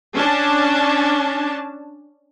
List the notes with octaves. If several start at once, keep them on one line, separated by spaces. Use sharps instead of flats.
C#4 D4 A5